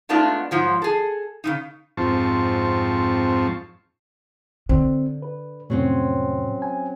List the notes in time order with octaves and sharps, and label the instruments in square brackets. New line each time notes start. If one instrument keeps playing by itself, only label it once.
[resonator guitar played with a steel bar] G#3 A3 B3 D4 D#4 F4
G#2 F3 F#3
G#4 A4
C#3 E3 D#4
[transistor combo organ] F2 G#2 F3 C4 A5 C#6
[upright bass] D3 [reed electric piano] C4
[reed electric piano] B4
[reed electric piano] F2 A2 C3 [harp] F#3 C4 C#4
[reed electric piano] G#5